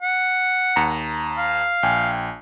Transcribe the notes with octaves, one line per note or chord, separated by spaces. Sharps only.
F#5
D#2 A#5 C#7
F5
A#1 G5 G#5